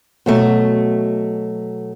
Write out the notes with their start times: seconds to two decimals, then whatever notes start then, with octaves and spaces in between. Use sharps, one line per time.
0.26 B2 F#3 A3